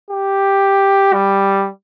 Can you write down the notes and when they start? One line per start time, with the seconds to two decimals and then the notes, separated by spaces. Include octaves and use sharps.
0.11 G4
1.14 G3